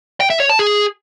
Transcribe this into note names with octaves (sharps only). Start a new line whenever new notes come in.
G5
E5
C#5
A5
G#4